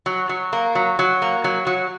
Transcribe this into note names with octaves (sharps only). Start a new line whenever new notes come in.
F#3
F#3
A#3
F#3
F#3
A#3
F#3
F#3